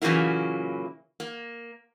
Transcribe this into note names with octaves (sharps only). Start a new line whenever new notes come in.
A#2 C#3 E3 F#3 A#3 E4
A#3